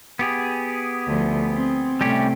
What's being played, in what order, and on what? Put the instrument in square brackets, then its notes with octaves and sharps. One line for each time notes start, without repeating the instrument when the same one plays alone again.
[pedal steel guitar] B3 G4 G#4
[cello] D2 F3
C4
[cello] A2 C3 [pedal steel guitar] G3 C#4 G4